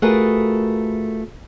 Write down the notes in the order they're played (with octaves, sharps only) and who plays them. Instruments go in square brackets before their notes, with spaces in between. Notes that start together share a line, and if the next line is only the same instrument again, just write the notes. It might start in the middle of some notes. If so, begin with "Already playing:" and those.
[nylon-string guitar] A3 F4 F#4 G#4 A#4 B4